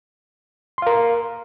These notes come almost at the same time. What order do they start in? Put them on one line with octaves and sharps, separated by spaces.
C6 F5 A#4